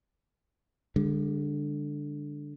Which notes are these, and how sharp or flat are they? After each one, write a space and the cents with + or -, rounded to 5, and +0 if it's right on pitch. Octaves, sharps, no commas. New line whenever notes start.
D3 +0 G#3 -45